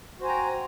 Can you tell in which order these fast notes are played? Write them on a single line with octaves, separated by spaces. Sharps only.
F#4 C5 G#5 A#5 G5